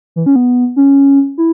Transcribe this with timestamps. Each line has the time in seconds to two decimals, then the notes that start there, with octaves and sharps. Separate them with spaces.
0.16 E3
0.26 C#4
0.36 B3
0.76 C#4
1.38 E4